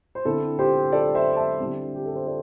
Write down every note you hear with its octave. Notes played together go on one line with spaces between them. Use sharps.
C5
D3 C4 E4 A4
G4 C5
A4 D5
C5 E5
E5 A5
D3 G3 C4 E4
G4
A4
C5
A4 D5